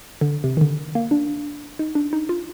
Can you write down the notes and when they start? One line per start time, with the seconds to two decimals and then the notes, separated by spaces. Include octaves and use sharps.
0.21 D3
0.44 C3
0.57 D#3
0.61 D3
0.95 A#3
1.11 D4
1.79 D#4
1.95 D4
2.13 D#4
2.29 F4